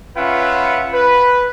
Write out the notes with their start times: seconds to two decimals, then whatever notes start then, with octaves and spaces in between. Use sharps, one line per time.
0.17 C#4 F4 B4 E5 F#5
0.93 B4